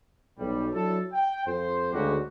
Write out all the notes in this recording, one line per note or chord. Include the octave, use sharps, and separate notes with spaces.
B1 G3
F#3 D4 E4 A4
G5
F2 C5
D2 C#3 G#3 A#3 F#4 G4